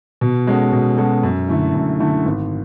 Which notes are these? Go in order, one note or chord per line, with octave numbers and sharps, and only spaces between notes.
B2
G#3 C#4 F#4 A4
B2
G#3 C#4 F#4 A4
F#2
D3 A3 E4
F#2
D3 A3 E4
G#1